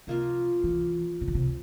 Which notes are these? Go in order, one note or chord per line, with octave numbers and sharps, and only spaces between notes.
C3 F3 A#3 F4
E3
C3
D3
C3